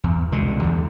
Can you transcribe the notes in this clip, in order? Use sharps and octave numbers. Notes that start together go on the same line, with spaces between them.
E2
C2 B2 D3 G#3
E2 D3